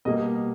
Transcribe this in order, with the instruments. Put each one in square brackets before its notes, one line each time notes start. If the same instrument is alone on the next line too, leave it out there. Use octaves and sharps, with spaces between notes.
[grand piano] B2 G3 A#3 D#5